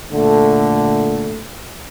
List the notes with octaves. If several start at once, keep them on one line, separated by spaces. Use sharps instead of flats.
A#2 D3 A3